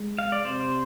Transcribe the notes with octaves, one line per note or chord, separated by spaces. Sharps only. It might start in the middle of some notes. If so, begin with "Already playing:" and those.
Already playing: G#3
F5
D5
C3 C5